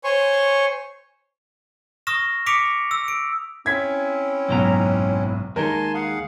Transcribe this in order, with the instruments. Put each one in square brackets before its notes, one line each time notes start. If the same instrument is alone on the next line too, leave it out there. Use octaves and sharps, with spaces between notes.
[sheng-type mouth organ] C5 C#5 G#5 C6 C#6
[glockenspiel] C#6 D#6 F6 A#6 E7
D6 D#6 B6 C#7 D7 F7
E6
D7
[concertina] C4 C#4 E4 [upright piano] G#6 B6
[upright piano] F#1 B1 [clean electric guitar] G#2 B2 A#5
[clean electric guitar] D#2 D#4 [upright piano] G#3 A#4 [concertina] G#5 A5 C6
[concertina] G#4 F5 F#5